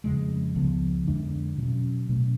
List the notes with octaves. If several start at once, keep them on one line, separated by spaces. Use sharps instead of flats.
F2 C#3 G#3
C#2 C#3 F3 B3
F2 D3 G#3 D4
B2 F#3 C#4
B2 F#3 A3 C#4